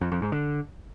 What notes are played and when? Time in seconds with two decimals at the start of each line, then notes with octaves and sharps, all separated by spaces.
0.01 F2
0.12 F2
0.22 G#2
0.32 D3